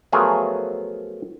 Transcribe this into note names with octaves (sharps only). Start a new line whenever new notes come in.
F3 F#3 A3 B3 G#4 A#4